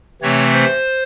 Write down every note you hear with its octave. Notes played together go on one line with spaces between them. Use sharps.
C3 E3 A3 C4 C#5
C5